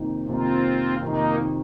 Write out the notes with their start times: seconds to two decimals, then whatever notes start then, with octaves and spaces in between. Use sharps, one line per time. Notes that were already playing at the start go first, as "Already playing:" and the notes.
Already playing: F2 C3 D#3 A#3 D#4
0.27 F2 C3 D#3 A#3 C4 D#4 F4
1.02 F2 C3 D#3 A#3 D#4